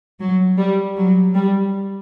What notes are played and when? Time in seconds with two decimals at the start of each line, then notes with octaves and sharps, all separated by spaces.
0.20 F#3
0.58 G3
0.97 F#3
1.35 G3